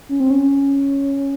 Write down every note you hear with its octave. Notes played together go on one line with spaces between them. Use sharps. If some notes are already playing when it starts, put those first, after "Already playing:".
C#4
C4
C#4